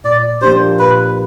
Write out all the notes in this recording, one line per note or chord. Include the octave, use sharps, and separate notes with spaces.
A#2 D5
F3 A#3 D4 G4 C5
A#2 B4